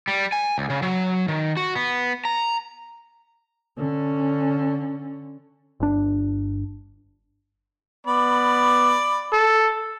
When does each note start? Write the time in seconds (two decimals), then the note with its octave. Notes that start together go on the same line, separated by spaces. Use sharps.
0.08 G3
0.32 G#5
0.58 C#2
0.70 C#3
0.82 F#3
1.28 D#3
1.57 F#4
1.75 B3
2.25 A#5
3.77 D3 C#4
5.80 G1 D4
8.07 B3 D5 B5
9.33 A4